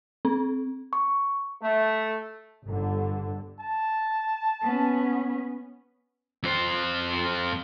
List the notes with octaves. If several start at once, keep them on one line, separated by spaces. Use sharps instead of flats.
C4
C#6
A3
G1 D3
A5
B3 C#4
F2 C5